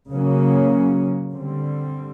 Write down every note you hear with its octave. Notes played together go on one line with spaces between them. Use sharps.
C#3 F#3 A#3 C#4
D3 G3 C4